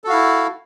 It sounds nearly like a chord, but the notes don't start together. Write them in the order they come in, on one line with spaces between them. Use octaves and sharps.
A4 F#4 F5 E4